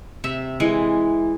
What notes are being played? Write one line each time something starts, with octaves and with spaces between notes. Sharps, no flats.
C3 E5
E3 G#3